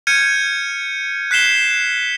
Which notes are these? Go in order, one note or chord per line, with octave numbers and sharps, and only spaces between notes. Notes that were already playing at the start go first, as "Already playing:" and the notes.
F6 G6 G#6 C#7 D#7
F#6 B6 C7 E7 G7